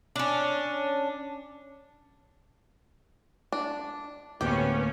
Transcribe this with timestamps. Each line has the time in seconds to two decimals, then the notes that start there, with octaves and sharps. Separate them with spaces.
0.16 C#4 D4
3.52 D4
4.41 D2 A2 A#3 B3 C#4 G4